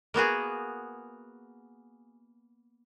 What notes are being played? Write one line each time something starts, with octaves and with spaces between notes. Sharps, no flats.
A#3 B3 F#4 G#4